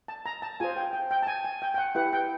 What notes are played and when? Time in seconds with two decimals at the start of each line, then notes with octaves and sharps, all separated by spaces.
0.08 A5
0.26 A#5
0.42 A5
0.60 F4 G#4 C5 G#5
0.77 G5
0.93 G5
1.11 G5
1.22 A5
1.27 G#5
1.45 G#5
1.62 G5
1.74 G5
1.78 F#5
1.95 E4 G4 B4 F#5
2.13 G5